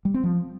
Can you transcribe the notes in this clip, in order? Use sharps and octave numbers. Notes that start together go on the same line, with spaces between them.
G3
C4
F3